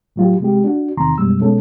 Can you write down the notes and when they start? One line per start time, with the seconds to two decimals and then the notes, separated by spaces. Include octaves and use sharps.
0.16 A2 F#3 F4 G4
0.40 C3 G#3 G4
0.64 D4 F#4
0.97 E2 C3 D#3 A#5 C6
1.18 F#2 B2 G3 G#3 E6
1.41 B2 G#3 C#4 A4